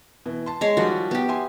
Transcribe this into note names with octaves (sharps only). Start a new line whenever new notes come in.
B2 E3
A5 C6
G#3 C#5
D#3 F3 G3 F#4
B3 G4
E5 G#5 C6